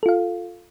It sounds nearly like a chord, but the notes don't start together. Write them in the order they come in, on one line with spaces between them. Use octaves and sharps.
A4 F4 F5